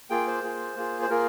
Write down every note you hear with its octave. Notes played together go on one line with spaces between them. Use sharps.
A#3 F4 G#4 G5
C5
A#3 F4 G#4
A#3 F4 G#4
C5
A#3 F4 G#4 A#4